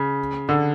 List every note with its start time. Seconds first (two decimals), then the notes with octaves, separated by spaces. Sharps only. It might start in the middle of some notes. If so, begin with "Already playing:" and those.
Already playing: C#3
0.49 D3